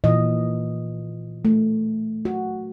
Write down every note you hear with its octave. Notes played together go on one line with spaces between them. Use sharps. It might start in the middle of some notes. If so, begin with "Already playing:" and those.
A#2 E3 D#5
A3
F#4